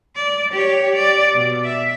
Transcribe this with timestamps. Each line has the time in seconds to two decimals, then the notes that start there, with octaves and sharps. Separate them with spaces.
0.16 D5
0.53 G4 C#5
0.95 D5
1.33 B2
1.64 E5